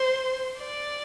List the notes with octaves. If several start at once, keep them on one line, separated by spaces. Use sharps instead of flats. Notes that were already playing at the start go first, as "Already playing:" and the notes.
Already playing: C5
D5